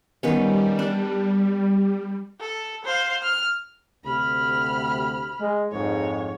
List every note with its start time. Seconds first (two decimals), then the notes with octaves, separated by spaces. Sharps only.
0.23 D#3 G3 B3 C#4
0.79 D4
2.40 A4
2.85 C5 F5
3.23 F6
4.04 D2 C3 B5 F6
5.40 G#3
5.71 A#1 F2 G#2 C#5